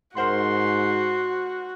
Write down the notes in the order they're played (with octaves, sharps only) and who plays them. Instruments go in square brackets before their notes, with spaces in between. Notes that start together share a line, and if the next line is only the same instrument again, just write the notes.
[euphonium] G#2 [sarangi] F#4 [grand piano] A#4 C5 F#5 [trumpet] C6